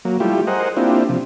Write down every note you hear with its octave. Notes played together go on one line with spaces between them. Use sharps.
F#3 A#3
G3 A3 E4 F4 G4
G#4 A#4 C5 D#5 F#5
A#3 C4 D4 E4 F4 G4
C3 F3